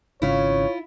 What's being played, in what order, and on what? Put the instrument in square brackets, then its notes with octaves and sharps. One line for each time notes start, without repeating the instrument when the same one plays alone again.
[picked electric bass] G#1 C#3 [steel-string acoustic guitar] E4 F4 [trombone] C#5